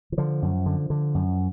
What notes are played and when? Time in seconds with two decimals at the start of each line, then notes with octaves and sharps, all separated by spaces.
0.12 E3
0.18 D3 F3
0.42 F#2
0.66 D3
0.90 D3
1.15 F#2